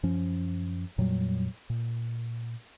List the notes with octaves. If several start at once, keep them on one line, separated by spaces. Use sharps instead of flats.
F#2 F3 C#4
F2 A#2 F#3 G3
A#2